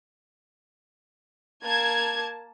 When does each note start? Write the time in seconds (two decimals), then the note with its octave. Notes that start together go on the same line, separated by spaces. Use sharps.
1.64 A#3 A5 G#6